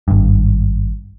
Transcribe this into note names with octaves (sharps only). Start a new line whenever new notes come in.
G#1 G2